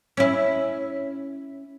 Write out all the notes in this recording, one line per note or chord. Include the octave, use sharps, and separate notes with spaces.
C#4 E4